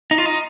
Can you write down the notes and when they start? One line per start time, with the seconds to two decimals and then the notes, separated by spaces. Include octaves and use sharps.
0.11 D#4
0.18 F4
0.26 D#4